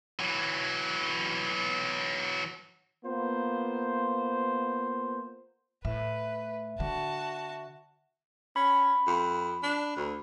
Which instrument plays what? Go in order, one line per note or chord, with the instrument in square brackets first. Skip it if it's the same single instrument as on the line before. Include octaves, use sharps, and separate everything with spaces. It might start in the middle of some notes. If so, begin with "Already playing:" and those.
[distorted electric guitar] E3 F#3
[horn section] A#3 B3 F4 C5
[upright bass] A2 [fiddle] B4 [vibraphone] E5
[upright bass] D3 [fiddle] F#4 A5
[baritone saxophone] C#4 [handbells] B5
[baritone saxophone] F2
D4
D2